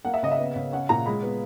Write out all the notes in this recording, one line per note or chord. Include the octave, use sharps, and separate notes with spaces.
A#3 F#5
E5
C#3 D#5
E5
B3
C#3
C#4 F#5
A#2 A#5
G#3 B5
B3